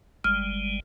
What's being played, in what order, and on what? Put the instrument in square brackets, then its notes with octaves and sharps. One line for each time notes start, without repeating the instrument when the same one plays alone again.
[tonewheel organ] G1 G3 G#3 [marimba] F6